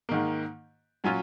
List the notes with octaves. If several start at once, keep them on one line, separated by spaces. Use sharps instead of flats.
G#2 D#3 A#3
A#2 F#3 C#4 F4